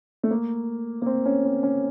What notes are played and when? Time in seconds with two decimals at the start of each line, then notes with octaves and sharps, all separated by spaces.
0.23 A3
0.31 A#3
1.02 A#3
1.06 C4
1.26 C#4
1.45 C4
1.63 C#4